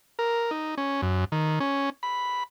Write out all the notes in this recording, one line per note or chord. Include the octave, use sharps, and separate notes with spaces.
A#4
D#4
C#4
F#2
D#3
C#4
B5